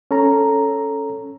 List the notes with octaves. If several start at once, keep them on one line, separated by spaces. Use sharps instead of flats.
C#4 A4 A#5